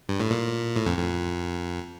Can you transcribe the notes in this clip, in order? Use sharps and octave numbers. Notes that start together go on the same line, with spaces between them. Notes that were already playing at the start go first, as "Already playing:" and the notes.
G2
A2
A#2
A2
F2
F2